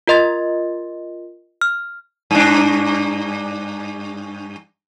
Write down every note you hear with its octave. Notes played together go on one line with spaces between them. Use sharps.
F4 A#4 D#5 C6 A6
F6
G2 D4